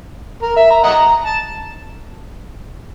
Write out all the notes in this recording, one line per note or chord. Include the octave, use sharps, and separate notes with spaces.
A#4
E5
A#5
D#5 F#5 A#5
A5